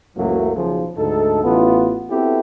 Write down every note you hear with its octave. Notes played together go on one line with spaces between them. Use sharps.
C#2 F#2 E3 F#3 A3 A#3
B1 C#3 F3
D2 G#2 D#4 A4
A1 B3 F4
B3 C4 E4 F#4 G4 A4